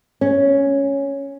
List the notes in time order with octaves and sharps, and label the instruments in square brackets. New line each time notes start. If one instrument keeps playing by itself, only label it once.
[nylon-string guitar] C#4